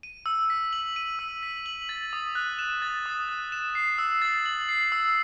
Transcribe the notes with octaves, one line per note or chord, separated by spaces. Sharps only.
D#7
E6
B6
F#7
D#7
E6
B6
F#7
A6
D#6
F#6
E7
A6
D#6
F#6
E7
C7
E6
A6
F#7
C7
E6